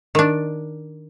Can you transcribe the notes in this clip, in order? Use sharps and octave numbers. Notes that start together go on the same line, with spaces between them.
D#3 D4